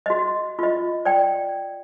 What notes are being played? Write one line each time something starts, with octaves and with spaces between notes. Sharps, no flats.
F#4 D#5
F4 D#5
D5 G5